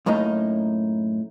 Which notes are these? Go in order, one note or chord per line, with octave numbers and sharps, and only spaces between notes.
F#2 A2 A#3 D#4